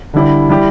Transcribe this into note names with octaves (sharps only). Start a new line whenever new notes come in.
D3 G3 E4 G4
G3 E4 G4